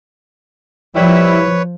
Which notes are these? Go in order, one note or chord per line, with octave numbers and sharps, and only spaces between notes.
F3 G3 E4 B4 C#5